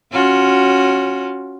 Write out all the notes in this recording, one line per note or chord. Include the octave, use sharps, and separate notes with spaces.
C#4 F4 F#4